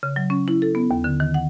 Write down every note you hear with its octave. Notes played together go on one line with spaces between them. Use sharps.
C#3
F#3
C#4
E4
A4
B3
D#2
D3
D#3
F#5